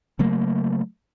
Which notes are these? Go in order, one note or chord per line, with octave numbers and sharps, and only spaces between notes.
C#3 F#3 A3 A#3